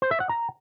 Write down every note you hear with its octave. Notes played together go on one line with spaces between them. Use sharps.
C5
E5
F#5
A#5